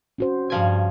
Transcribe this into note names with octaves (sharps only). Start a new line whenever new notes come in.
C#4 F#4 C5
G2 C#3 F3 G#5